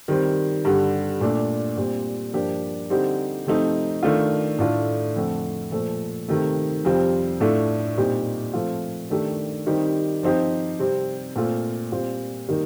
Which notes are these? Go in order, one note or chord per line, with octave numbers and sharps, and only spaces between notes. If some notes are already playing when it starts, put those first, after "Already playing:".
D#3 G3 C4
G2 D3 G3
A#2 A3 D4
A#2 G3 C4
G2 F3 A#3 D4 G4
D3 G3 C4 D#4 G4
C3 F3 A3 C4 D#4
D#3 A3 D4 F4
A2 A3 D4 F4
F2 D3 A3
A#2 F3 A3
C3 D#3 A3
F2 C3 G3 C4 F4
A2 A3 D4 F4
A#2 G3 C4 D#4 G4
F3 A3 C4 F4
D#3 A3 D4 G4
D#3 G3 C4 D#4 G4
F3 C4 D#4 G4
C3 G3 C4
A#2 A3 C4 F4
A#2 G3 C4 F4
D#3 G3 A#3 D#4